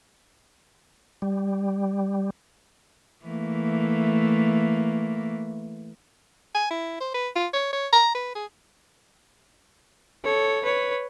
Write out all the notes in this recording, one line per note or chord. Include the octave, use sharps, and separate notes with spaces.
G3
E3 A3 A#3
G#5
E4
C5
B4
F4
C#5
C#5
A#5
B4
G#4
A4 C#5
B4 C#5